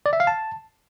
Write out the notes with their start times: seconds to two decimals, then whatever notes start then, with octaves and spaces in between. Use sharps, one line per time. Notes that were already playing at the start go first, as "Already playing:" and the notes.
0.06 D5
0.13 E5
0.20 F5
0.27 A5